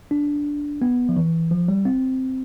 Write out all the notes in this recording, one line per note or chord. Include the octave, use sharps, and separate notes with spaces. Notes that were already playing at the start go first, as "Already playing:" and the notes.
D4
B3
F3
E3
F3
G3
C4